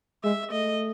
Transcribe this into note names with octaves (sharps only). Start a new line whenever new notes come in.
G#3 E5
A3 D#5